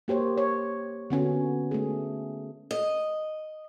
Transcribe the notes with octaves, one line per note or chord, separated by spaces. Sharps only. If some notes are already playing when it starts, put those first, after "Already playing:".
A#3 G4 C5 C#5
C#5
D3 B3 C#4 F#4
A3 G#4
D#5